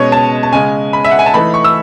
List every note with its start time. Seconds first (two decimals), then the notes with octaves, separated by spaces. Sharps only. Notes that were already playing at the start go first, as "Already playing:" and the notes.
Already playing: B2 G#3 C#4 C#5 D#5
0.12 A5
0.43 A5
0.52 C#3 G#3 C#4 G#5
0.93 B5
1.04 E5
1.11 F#5
1.19 G#5
1.26 A5
1.34 E3 A3 D#4 B5
1.54 C#6
1.64 E6